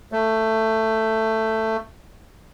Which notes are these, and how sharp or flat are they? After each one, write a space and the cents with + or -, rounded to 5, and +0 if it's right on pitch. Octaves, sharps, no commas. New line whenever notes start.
A3 +10